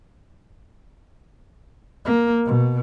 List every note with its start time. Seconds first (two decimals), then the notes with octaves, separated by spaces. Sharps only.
2.06 A#3
2.46 B2